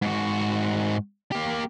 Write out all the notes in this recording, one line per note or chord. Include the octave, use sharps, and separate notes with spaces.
G#2 F#4
A#3 G4